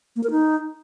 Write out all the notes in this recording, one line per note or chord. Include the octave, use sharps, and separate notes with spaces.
A#3
A#4
D#4